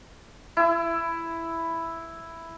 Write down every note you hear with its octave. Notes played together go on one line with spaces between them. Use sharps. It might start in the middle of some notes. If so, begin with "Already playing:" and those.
E4 E6